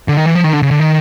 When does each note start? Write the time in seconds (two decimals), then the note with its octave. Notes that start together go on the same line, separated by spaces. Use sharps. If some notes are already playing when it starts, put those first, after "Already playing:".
0.08 D3
0.17 D#3
0.26 E3
0.35 F3
0.44 D#3
0.53 D3
0.63 C#3
0.71 D3
0.80 D#3